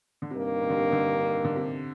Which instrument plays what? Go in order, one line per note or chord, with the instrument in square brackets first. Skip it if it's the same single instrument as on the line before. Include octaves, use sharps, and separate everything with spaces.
[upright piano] D3
[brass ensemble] G2 D#3 A#3 [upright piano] C3
[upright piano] C3
D3
C3
D3
D3
C3